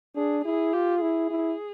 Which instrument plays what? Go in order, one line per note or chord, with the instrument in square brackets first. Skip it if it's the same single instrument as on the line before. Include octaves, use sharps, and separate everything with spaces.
[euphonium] D4 [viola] G#4
[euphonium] E4 [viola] G#4
[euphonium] F4 [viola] G4
[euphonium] E4 [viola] G#4
[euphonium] E4